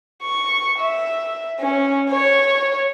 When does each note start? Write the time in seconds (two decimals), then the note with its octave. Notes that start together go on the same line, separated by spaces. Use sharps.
0.23 C#6
0.79 E5
1.60 C#4
2.10 C#5